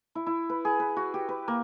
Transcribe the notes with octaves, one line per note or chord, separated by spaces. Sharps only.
E4
E4
B4
G#4
B4
F#4
G4
B4
A#3